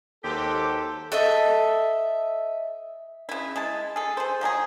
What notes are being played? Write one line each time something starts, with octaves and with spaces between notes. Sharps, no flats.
D#2 F#3 G#3 G4 A4 C5
A4 D#5 E5
C#3 E4
G#3 E4 A5
G#4 A4
G#4 C5
F3 F#3 D#4 G#4